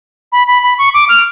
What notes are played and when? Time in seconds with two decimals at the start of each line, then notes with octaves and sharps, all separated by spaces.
0.32 B5
0.48 B5
0.63 B5
0.78 C#6
0.94 D6
1.09 F6